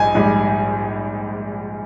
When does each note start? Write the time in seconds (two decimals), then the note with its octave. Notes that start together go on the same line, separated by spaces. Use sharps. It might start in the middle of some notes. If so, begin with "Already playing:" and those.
Already playing: A#1 G#2 G3 D#5 G#5
0.15 A#1 G#2 G3